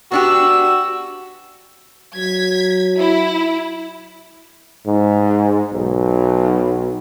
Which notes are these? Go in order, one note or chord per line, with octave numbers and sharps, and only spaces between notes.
B3 D4 F#4 G4 E6
F#3 G#6 B6
E4
G#2
B1